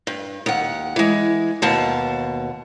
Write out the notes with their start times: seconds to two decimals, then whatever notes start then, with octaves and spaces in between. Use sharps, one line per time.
0.07 G2
0.46 D#2 F#5
0.96 E3 G#3
1.62 D#2 B2 A5